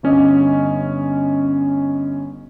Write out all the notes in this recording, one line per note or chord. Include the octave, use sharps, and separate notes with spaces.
G1 C#4 D#5